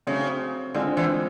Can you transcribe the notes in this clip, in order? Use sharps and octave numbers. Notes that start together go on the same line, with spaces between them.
C#3 F#3 A3 C4
D3 G#3 C4 F4 G#4 C5
D3 E3